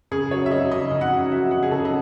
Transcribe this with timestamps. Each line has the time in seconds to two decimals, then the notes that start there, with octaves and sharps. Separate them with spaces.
0.11 C#3 G#4
0.31 F#3 C#5
0.46 E5
0.51 F#3 D#5
0.71 C#3 D#5
0.91 C#3
1.01 F#5
1.11 F#3
1.32 F#3 E5
1.51 C#3 F#5
1.63 G#4
1.71 C#3 A4
1.85 D#5